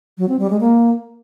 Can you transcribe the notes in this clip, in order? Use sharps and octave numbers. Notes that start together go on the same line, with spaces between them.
F#3
C4
G3
G#3
A#3